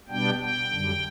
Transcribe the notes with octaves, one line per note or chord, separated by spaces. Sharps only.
B2 G3 B3 D4 G5
G5
F#2 D3 G3